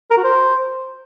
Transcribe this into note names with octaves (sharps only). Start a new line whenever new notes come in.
A#4
F#4
C5